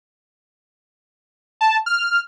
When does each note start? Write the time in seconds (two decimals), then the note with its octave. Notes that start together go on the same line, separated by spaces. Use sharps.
1.61 A5
1.86 F6